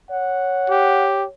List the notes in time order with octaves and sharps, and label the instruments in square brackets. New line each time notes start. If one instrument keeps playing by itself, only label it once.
[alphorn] C#5 [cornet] F#5
[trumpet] G4